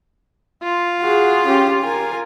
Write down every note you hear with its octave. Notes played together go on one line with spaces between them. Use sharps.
F4
F#4 G#4
C#4 G4
A#4 G#5